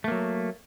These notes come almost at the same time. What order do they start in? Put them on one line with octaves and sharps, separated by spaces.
A3 A#3 F#3